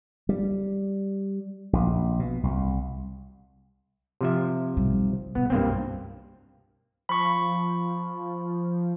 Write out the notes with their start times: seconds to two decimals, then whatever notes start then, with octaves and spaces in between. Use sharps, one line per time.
0.29 G3
1.73 A#1
2.19 B2
2.43 C2
4.21 C3 F3 E5
4.77 B1 G3
5.35 C2 B2 B3
5.50 G2 A#3 C4
7.09 F3 B5 C#6